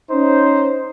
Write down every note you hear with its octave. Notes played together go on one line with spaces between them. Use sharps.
C#4 D#4 C5